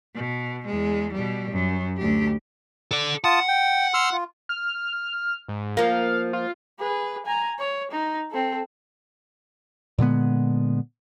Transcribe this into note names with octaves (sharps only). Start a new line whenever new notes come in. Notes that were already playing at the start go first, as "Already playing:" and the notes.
B2
E2 G#3
B2 G3
F#2
D2 G4
A4 D5
F4 F#5 A5 D#6
G5
C6 E6 F6
F4
F6
G#2
F3 A#3 F5
F4
G#4 B4
G#5 A#5
C#5
D#4
C4 A4
A#2 D3 G#3 B3